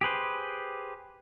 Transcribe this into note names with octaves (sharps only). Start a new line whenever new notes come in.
G4 G#4 B4 C5